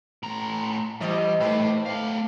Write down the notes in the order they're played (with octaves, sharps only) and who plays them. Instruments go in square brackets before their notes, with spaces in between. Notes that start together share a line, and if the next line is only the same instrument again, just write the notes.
[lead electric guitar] A2 A#5
[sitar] C3 E3 D#5 [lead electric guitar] G3
[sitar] G#2 C4 B4 [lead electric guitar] A3 E4
[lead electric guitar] A3 F5